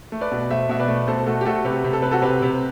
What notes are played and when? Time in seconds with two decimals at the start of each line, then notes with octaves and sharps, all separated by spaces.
0.12 A3
0.21 B4 D5
0.31 B2
0.50 A3 C5 E5
0.69 B2 E5
0.80 B4 D5
0.88 A3
1.08 B2 A4 C5
1.26 A3 F#4 A4
1.41 G4
1.45 A3 F#4 A4
1.65 C3 G4 B4
1.84 C3
1.93 A4
2.02 C3 B4
2.11 F#4 A4
2.22 C3 G4 B4
2.42 C3